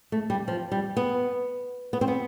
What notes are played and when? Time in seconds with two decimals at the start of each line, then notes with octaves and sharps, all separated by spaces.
0.12 A3
0.30 G3
0.48 F3
0.72 G3
0.97 B3
1.93 B3
2.01 C4
2.08 B3